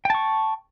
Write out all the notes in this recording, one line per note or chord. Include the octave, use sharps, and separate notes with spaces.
G5 A5 C#6